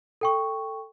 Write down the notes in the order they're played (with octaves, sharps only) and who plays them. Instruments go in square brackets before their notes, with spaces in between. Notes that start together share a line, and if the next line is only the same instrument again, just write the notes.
[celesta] A4 G5 C#6